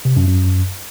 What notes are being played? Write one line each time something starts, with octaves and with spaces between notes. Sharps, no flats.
C3
F#2
F#2